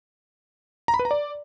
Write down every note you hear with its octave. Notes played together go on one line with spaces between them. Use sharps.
A#5
B5
B4
A#5
D5